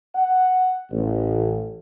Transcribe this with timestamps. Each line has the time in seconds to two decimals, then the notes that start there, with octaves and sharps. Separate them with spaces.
0.15 F#5
0.90 A1